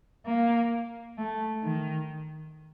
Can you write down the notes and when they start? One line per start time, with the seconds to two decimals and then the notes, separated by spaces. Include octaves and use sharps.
0.26 A#3
1.18 A3
1.64 D#3